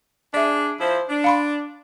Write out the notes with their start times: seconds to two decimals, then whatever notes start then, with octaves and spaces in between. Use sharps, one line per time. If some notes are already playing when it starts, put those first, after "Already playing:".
0.34 D4 G#4 D5 E5
0.80 F3 E4 C5
1.09 D4
1.24 F5 B5 C6